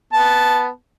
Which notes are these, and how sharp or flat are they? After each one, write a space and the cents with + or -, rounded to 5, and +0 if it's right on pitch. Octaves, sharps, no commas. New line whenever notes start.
B3 +0 A5 -10